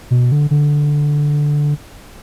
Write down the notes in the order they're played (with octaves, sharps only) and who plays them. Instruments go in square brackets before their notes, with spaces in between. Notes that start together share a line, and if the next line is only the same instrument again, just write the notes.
[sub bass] B2
D3
D3